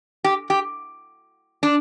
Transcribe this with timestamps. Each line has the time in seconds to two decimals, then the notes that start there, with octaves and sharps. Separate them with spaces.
0.24 G4
0.50 G4
1.63 D4